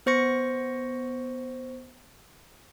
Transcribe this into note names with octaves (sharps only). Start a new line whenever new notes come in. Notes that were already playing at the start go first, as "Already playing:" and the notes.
B3 C5 C#6 A#6 C#7